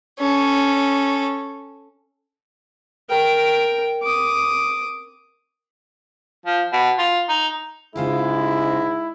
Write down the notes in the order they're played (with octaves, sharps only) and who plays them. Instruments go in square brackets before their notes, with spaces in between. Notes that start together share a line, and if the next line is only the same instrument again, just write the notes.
[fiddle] C#4 A4
[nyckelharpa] A#4 G5
D6 D#6
[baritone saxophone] F3
B2
F4
D#4
[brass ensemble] G#2 G#3 [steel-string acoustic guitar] C#3 F4 G4 [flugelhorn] E4